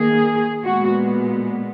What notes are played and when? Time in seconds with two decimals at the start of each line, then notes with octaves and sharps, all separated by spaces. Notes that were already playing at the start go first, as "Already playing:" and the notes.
Already playing: D#3 A#3 G#4
0.64 A#2 G#3 B3 F#4